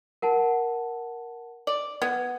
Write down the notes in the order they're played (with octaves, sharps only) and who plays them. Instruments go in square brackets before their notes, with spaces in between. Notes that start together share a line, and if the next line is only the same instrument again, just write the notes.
[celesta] A#4 F#5 A5
[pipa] D5
[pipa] B3 [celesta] G#6